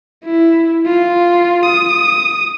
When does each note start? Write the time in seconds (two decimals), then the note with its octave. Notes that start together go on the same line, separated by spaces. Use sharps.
0.25 E4
0.86 F4
1.65 D#6